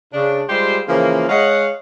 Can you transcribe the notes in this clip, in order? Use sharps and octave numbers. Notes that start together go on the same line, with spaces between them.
C#3 D4
G3 G#3 F4 G4 C5 C6
C#3 E3 F3 A#3
G#3 C#5 D#5 F5 F#5